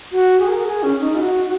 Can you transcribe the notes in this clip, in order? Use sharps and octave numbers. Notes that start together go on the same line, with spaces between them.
F#4
G#4
A#4
G#4
C#4
D#4
F#4